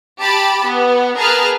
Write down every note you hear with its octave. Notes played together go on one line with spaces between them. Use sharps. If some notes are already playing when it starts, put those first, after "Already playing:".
G4 A5 B5
B3
G#4 A#4 B4 A5 F6